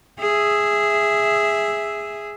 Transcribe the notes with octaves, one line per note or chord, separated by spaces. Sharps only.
G#4 E5